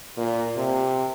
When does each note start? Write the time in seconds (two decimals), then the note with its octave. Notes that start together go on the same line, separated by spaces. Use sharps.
0.17 A#2
0.57 C3